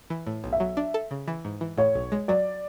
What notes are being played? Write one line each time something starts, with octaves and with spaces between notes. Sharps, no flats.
E3
A2
B1
E5
F#3
D4
A4
C#3
E3
G#2
E3
A2 C#5
B1
G#3
F#3 D5